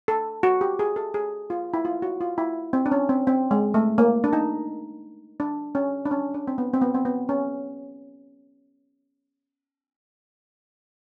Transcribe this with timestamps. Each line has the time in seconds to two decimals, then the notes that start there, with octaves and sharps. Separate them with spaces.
0.08 A4
0.43 F#4
0.61 G4
0.79 G#4
0.96 A4
1.14 G#4
1.50 F4
1.74 E4
1.85 F4
2.02 F#4
2.21 F4
2.38 E4
2.73 C4
2.86 D4
2.92 C#4
3.09 C4
3.27 C4
3.51 G#3
3.74 A3
3.98 A#3
4.24 D4
4.33 D#4
5.40 D4
5.75 C#4
6.05 D4
6.11 C#4
6.34 D4
6.48 C4
6.58 B3
6.74 C4
6.81 B3
6.94 C4
7.05 B3
7.29 C#4